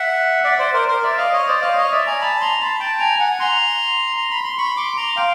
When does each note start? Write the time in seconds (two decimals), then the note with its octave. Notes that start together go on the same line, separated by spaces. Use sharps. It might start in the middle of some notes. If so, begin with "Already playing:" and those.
Already playing: E5 F#5
0.44 D5 E5
0.59 C5 D5
0.74 A#4 C5
0.88 A#4 C5
1.03 D5 E5
1.18 D#5 F5
1.33 C#5 D#5
1.47 C5 D5
1.62 D#5 F5
1.77 C#5 D#5
1.92 D5 E5
2.06 G#5 A#5
2.21 A5 B5
2.41 A#5 C6
2.61 A5 B5
2.80 G5 A5
3.00 G#5 A#5
3.19 F#5 G#5
3.40 A#5 C6
4.17 A#5
4.31 B5
4.44 C6
4.58 B5 C#6
4.77 C6 D6
4.97 A#5 C6
5.17 F5 G5